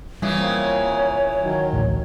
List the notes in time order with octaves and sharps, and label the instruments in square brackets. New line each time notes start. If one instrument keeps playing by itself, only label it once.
[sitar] A#2 C#3 E3 [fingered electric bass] G3
[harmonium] A#3 C4 [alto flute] C#5
[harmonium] D#3 F#3
[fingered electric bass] A1 D2